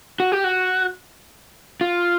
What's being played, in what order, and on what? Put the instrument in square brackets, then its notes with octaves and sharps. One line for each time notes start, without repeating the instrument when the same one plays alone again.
[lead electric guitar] F#4
G4
F#4
F4